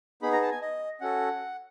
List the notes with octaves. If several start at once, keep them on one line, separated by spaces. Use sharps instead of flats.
B3 D#4 G#4 B5
A#5
A5
G#5
D#5
C#4 F#4 A4 F#5